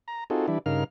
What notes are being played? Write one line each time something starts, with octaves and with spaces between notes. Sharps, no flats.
A#5
C4 D#4 F4 F#4 G#4 A4
E3 G3 D4 E4
G2 C#3 D#4 A#4 F5 F6